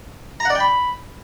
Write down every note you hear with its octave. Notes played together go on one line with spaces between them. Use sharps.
A#5
F#5
D5
G5
B5